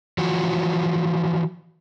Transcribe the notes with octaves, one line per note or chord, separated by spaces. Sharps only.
E3 F3 F#4